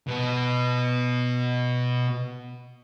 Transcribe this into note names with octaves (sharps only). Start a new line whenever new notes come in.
B2 B3